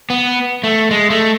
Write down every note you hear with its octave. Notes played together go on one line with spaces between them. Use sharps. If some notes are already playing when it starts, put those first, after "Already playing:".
B3
A3
G#3
A3